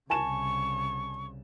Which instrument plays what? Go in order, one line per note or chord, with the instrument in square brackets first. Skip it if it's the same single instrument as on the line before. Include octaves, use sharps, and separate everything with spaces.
[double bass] C2 C#3 [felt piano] G#5 A5 E7 [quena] C#6